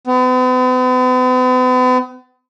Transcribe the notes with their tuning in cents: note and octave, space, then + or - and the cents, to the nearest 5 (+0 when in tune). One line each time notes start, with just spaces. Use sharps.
B3 +45